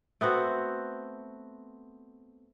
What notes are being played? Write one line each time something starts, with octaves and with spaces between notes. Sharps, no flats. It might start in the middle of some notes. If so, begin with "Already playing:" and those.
A3 B3 C4 F#4